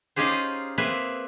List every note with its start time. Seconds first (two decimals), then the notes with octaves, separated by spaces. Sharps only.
0.16 C#4 D#4 F4 G4 G#4 C5
0.78 A#3 C4 G#4 B4 E5